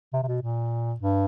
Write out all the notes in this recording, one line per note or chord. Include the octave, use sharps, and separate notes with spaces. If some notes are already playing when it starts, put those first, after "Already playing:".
C3
C3
B2
A#2
G2